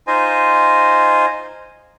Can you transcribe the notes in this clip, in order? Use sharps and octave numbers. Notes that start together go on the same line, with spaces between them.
D#4 F4 C5 D#5 G#5